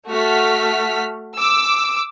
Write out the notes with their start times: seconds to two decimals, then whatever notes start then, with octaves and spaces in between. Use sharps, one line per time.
0.10 A3 F#4 F6 B6
1.37 D6 E6